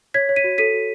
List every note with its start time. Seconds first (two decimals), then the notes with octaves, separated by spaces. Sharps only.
0.14 C#5 G#6 B6
0.29 C#5
0.36 B6 D#7
0.44 F#4
0.58 A4 B6 D#7
0.74 F#4